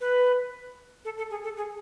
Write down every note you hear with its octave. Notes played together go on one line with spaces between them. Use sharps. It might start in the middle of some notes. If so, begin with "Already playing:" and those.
B4
A4
A4
G#4
A4
G#4